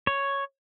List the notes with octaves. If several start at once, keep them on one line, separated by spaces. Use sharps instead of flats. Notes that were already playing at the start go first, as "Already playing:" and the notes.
C#5